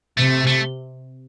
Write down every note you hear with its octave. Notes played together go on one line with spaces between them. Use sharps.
C3 A3
A3